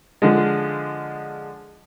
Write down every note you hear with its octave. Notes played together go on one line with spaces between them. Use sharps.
D3 F3 G#3